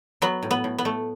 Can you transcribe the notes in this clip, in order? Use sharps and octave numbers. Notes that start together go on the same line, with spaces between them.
F#3 B3
A2
B3
A2
B3
A3